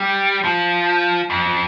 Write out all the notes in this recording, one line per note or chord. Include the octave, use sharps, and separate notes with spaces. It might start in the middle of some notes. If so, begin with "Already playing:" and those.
Already playing: G3
F3
F2